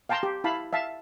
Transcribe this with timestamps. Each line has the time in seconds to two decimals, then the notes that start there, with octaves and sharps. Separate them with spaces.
0.09 F5 G5 A5 A#5 C6
0.23 G4
0.44 E4 F5 A5 B5
0.73 E5 F5 A5